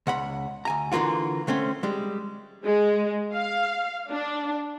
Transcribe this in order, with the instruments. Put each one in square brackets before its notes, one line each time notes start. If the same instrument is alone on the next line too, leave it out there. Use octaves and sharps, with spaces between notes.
[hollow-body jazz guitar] C#2 F#5 B5
D2 G#5 A#5
D3 E3 A#3 F4 F#4
D3 A3 C4 C#4
G3 G#3
[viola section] G#3
F5
D4